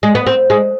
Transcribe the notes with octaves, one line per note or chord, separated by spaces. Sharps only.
G#3
B3
C4
G#3